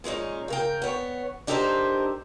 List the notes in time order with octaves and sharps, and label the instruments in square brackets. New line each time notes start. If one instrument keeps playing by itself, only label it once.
[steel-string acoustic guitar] A#2 G#3 C#4 D#4
C#3 A#4 G5
B3 C#5
D4 D#4 G4 A4 A#4 C5